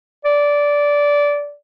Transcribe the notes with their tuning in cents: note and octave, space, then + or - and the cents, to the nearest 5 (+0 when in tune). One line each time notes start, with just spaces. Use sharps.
D5 -15